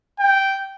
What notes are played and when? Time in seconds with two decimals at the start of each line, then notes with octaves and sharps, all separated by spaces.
0.20 G5